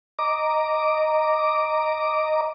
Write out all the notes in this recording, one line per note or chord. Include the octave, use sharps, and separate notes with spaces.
D#5 A#5 D6